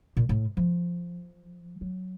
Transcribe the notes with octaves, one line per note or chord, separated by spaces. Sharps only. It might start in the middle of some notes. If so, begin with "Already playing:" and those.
A#2
A2
F3
F#3